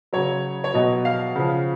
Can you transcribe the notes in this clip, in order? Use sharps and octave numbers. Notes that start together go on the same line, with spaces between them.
C#3 F#3 C#5
C#5
B2 F#3 D#5
F5
C#3 F3